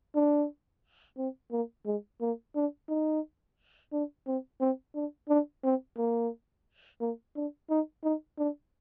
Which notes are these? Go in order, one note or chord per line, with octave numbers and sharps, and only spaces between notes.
D4
C4
A#3
G#3
A#3
D4
D#4
D4
C4
C4
D4
D4
C4
A#3
A#3
D4
D#4
D#4
D4